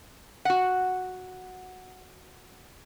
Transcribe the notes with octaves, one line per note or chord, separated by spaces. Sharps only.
F#4 F#5